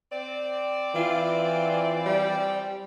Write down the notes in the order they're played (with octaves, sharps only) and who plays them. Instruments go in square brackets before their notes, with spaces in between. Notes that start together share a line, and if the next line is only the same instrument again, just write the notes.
[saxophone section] C4 D5
[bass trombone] E3 [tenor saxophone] F4
[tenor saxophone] G3